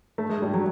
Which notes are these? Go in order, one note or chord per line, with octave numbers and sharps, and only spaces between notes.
A3
G#3
G3
F#3